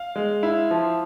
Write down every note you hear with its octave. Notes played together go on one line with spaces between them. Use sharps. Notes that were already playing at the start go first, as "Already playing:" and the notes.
Already playing: F5
G#3
E4
F3